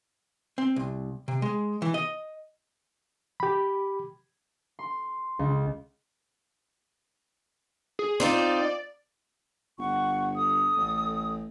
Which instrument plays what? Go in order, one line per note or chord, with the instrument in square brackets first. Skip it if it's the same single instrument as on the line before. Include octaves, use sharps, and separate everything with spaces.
[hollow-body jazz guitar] C4
C2
C3
G#3
E3
D#5
[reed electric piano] G4 B5
[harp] C6
C#2
[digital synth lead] G#4
[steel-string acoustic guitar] C4 D#4 F4 [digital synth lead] D5
[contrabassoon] G1 [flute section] F#5 C#6
[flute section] A4 D#6
[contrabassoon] A1